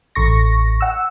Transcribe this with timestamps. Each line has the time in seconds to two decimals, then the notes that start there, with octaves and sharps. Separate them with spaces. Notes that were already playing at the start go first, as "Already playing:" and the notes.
0.15 A1 C#6 A#6
0.81 F#5 E6